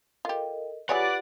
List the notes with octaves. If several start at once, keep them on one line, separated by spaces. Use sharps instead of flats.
F4 G4 A4 A#4 D#5
F#3 F4 G4 G#4 B4 C#5 D5 F#5